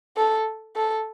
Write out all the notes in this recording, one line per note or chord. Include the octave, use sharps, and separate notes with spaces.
A4
A4